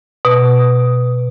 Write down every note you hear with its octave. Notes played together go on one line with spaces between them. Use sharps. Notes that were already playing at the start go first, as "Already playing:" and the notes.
B2